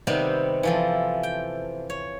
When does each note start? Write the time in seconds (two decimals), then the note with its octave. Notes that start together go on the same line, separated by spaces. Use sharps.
0.07 C3 D#3 G3 B3 C4
0.63 E3 F3 A4
1.23 G5
1.90 C#5